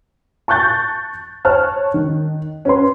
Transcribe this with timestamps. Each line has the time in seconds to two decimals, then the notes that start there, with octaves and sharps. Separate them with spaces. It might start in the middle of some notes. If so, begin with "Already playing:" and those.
0.48 A5 C#6 F#6 G6 A6
1.45 C#5 A5 F6 F#6
1.94 D#3
2.65 C#4 B4 C6